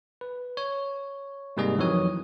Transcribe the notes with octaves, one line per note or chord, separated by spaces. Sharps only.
B4
C#5
G#2 C3 G3 A#3 G#4 D#5
F2 D#3 E3 F#3 C#5 D#6